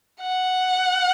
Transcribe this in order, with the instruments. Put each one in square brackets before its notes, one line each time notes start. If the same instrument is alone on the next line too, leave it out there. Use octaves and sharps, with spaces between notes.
[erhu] F#5